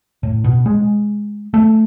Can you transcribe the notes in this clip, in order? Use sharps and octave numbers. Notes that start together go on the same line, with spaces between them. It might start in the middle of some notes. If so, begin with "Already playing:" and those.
A2
B2
G#3
A3